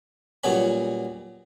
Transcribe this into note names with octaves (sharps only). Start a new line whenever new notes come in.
A#2 F#3 G3 B3 C#4 B5